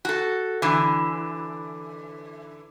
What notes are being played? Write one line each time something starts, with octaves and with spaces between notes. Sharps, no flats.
F#4 A4
D3 E3